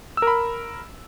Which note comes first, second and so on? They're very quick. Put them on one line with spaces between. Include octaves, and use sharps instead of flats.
E6 A#4 B5